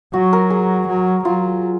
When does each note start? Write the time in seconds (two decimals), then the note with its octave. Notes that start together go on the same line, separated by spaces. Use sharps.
0.13 F#3 F#4
0.33 A#4
0.50 G#4
0.88 F#3
1.24 F#3 F4